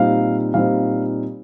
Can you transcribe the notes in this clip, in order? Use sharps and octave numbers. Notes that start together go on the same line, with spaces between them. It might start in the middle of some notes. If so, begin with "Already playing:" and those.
Already playing: A#2 G3 C4 D#4 F5
A#2 G3 C4 D#4 F5